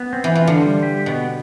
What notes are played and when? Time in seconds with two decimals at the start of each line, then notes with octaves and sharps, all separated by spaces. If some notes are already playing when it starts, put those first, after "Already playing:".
Already playing: B3
0.13 C4
0.24 E3
0.35 E3 F4
0.47 D3
0.60 G3
0.83 G4
1.06 B2 B3